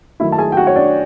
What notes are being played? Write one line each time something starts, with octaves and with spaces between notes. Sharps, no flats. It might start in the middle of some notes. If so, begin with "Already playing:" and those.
D#3 F#3 A3 E4 E5
A5
G#4 G#5
G5
F#4 F#5
C#5
D4 D5